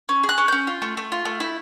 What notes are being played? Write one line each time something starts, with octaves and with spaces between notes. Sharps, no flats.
C#4
G#4
F#6
C#4
C#4 G6
F4
A3
A3
F4
A3
E4